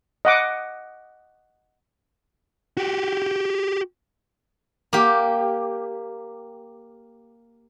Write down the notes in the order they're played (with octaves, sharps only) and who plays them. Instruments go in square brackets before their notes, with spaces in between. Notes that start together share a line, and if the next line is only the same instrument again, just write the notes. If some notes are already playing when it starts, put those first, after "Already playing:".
[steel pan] D#5 F#5 D6
[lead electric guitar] F#4 G4
[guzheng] A#3 G4